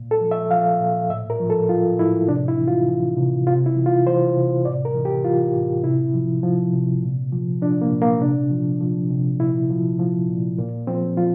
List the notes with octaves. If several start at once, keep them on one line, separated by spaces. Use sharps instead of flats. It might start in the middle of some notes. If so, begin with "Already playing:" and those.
Already playing: A#2
A4
F3
E5
F3 F5
A#2
A2 E5
A#4
F3
A4
F3 F4
A2 E4
C3 D4
E4
E3
F4
E3
C3
C3 F4
E4
E3
F4
E3 C5
C3
A2 D5
A#4
E3
G4
E3 F4
A2
C3 E4
F3
F3
C3
A#2
F3
F3 D4
A#3
A#2
A#3
C3 D4
F3
F3
C3
A#2 E4
F3
F3
A#2
A#2 A#3
F3 C4
F3 F4